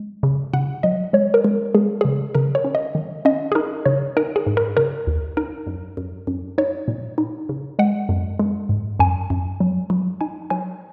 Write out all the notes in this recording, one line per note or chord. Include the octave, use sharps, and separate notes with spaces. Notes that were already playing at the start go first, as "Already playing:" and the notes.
Already playing: G#3
C#3
C#3 F#5
F#3 D#5
G#3 C#5
A#4
G#3
G#3 G#4
C#3 G#4
C#3 A#4
C#5
C#4
D#5
D#3
C#4 D#5
G#4
D#4 A#4
C#3 C#5
D#4 A#4
G#4
G#2
A#4
C#3 A#4
D#2
D#4 A#4
F#2
F#2
F#2
D#4 C#5
A#2
D#4
C#3
G#3 F#5
F#2
G#3
G#2
F#2 G#5
F#2
F#3
F#3
D#4 G#5
F#3 G#5